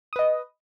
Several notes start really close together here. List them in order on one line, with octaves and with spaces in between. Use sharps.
D#6 B4 D#5